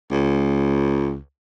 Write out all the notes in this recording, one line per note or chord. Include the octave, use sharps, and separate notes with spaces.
C#2